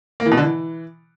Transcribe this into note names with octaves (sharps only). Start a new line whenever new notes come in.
A#3
E3
B2
D3
E3